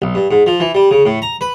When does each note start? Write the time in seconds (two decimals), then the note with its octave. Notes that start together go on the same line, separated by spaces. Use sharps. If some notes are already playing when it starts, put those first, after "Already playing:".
0.02 B1
0.15 G2
0.31 G#2
0.47 F3
0.60 E3
0.75 G3
0.91 C#3
1.05 A2
1.22 A#5
1.41 B4